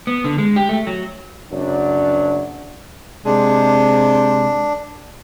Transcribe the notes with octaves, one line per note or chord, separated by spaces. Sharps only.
B3
D3
G#3
G4
A3
F#3
F#1 F#2 F#3 D4
C3 G#3 D4